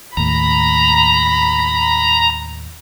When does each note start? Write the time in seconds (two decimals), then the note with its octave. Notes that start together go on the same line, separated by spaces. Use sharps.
0.17 D#2 A2 A#5 B5